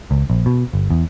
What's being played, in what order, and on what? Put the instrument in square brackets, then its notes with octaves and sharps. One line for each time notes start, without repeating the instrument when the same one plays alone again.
[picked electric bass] C#2
A#1
B2
G1
E2